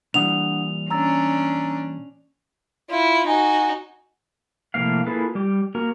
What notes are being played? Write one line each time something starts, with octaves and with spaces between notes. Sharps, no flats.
A#2 E3 G3 D4 F#5 D#6 F7
C#4 D4 A#5 E6 A6
E4 F4
D#4 F#4 G#5
A2 C3 F3 A#3 F5
A#3 E4 F4 G#4 A4 B4
G3 G4
A#3 F#4 A#4 A#5